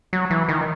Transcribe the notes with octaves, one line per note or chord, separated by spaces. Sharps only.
F#3
E3
D#3